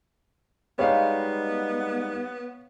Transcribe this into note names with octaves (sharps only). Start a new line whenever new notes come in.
G3 G#3 B3 D#4 C#5 F5